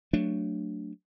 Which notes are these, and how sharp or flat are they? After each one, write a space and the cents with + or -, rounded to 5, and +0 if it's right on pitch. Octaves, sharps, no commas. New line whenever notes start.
F#3 -5 A3 +15 D4 +0